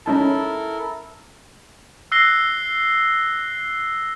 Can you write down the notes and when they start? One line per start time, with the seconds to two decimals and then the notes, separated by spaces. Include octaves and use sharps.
0.06 C#4 D#4 E4 A4 A#4 A5
2.12 E6 F#6 A#6 C7 G7